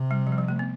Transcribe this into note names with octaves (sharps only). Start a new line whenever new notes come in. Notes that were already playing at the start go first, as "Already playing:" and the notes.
Already playing: C3
G3
F3
G3
F3
A3
B3